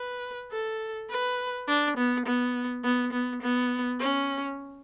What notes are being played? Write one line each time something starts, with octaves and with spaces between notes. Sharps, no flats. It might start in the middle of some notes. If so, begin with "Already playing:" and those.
Already playing: B4
A4
B4
D4
B3
B3
B3
B3
B3
C#4